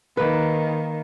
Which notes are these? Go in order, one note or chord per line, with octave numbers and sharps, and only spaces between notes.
D#3 A#3 B4